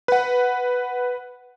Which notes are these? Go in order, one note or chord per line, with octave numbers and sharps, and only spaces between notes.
B4 F#5